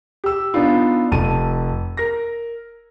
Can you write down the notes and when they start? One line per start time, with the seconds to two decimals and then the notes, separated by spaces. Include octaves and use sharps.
0.24 G4 E6
0.54 B3 D4 D#4 F4
1.12 F1 A5 D#7
1.97 A#4 A#6